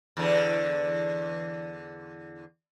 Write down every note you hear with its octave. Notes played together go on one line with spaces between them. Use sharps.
E2 D3